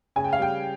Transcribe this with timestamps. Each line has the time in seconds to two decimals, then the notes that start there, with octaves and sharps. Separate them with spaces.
0.16 C#3 G#5
0.24 G5
0.33 F5
0.39 G3 G5